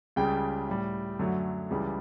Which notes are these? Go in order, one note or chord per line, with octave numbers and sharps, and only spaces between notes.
C#2 C#3 G3 G5
A2 G3
F#2 D3 F#3 A3
C#2 C#3 E3 G3